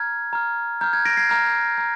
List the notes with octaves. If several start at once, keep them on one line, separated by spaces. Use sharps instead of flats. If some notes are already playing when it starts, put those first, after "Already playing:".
Already playing: A#5 F6 G#6
A#5 F6
A#5 F6 G6
G#6
A#6 D7
G#6 C7
A#5 F6
A#5